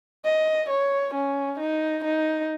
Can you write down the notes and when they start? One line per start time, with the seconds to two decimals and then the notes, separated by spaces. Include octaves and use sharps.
0.25 D#5
0.70 C#5
1.14 C#4
1.60 D#4
2.05 D#4